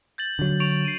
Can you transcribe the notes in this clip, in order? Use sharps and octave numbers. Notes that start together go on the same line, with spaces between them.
G6 A6 F#7
D3 F#3
C#6 D7 F7
C7 D#7